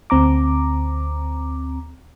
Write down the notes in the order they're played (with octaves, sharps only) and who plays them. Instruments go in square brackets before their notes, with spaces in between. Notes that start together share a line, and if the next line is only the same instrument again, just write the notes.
[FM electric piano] D2 C4 A#5 D6